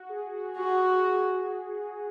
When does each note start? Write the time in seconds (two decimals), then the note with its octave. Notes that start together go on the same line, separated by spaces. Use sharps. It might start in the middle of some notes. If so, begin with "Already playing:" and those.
Already playing: F#4
0.09 G#4
0.33 F#4
0.56 F#4 G#4